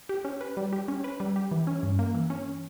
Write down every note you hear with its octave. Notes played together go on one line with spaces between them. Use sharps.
G4
C#4
B4
G3
G4
C#4
B4
G3
G4
E3
C#4
G2
A#3
E3
C#4